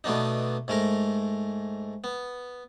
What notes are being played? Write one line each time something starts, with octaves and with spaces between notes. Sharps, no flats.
B2 A3 B3 D4 D#4
G#2 A3 A#4 A#5
B3